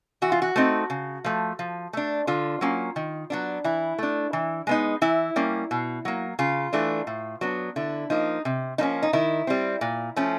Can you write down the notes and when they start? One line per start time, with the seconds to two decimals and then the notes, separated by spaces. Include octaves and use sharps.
0.22 E3 F#4
0.32 F4
0.42 F#4
0.56 A3 C4 D#4
0.90 C#3
1.24 F3 A3
1.59 F3
1.93 A3 D4
2.27 D3 F4
2.61 F#3 A#3 C#4
2.96 D#3
3.30 F#3 B3 D4
3.64 E3 E4
3.98 A3 D4
4.33 E3
4.67 G#3 B3 D#4
5.02 E3 E4
5.36 G3 A#3 C#4
5.71 B2
6.05 F#3 A#3
6.39 C#3 F4
6.73 E3 A3 D4
7.07 A2
7.41 F#3 B3 D4
7.76 D3 E4
8.10 F3 A#3 D#4
8.45 C3
8.78 F3 A#3 C#4 D#4
9.03 D#4
9.13 D#3 E4
9.47 G3 C4
9.81 A#2
10.16 F3 A3 C#4